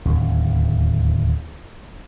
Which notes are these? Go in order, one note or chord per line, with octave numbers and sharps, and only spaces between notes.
D1 D#2 C#4